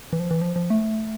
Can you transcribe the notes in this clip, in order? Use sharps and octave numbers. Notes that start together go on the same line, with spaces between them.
E3
F3
E3
F3
F3
A3